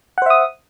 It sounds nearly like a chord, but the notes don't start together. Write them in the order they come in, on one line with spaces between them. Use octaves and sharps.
F#5 C5 E5 D#6